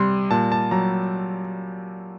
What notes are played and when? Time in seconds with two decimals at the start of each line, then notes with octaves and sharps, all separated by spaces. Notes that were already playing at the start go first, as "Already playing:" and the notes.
Already playing: C3 G3 C6
0.31 A#2 A5
0.52 A5
0.71 F#3 A#5